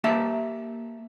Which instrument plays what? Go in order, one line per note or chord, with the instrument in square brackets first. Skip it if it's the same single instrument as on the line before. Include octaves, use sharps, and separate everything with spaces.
[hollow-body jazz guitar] A#3 G4 E5 A5